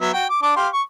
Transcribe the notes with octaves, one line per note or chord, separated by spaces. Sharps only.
F#3 B3 E5
F#4 G5
D6
D4 D6
G4 F5 C6
C#6